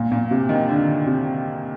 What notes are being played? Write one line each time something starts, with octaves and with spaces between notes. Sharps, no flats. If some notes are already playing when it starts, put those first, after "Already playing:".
Already playing: A#2
A#2
C3
D#3
D3
C3